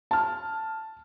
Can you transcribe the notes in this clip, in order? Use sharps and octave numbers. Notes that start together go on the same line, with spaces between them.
A5 F6